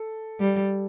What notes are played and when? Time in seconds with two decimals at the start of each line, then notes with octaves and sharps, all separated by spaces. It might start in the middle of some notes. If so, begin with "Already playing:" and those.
Already playing: A4
0.40 G3